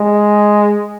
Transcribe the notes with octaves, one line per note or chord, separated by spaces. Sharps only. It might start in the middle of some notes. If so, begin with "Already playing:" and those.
Already playing: G#3